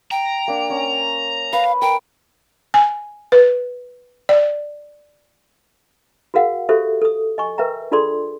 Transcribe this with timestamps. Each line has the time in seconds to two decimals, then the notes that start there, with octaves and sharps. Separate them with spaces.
0.11 G5 A#5
0.48 A#3 D4
0.70 C#4
1.53 B4 F5
1.82 A#4 G5
2.74 G#5
3.32 B4
4.29 D5
6.34 F#4 G#4 A#4 F5 F#5
6.69 F#4 G4 A4 C5 E5
7.02 A4 D#6
7.38 D#5 G#5 C#6
7.58 A#4 B4 E5 G5 A#5
7.91 D4 F4 G#4 A4 D5 C6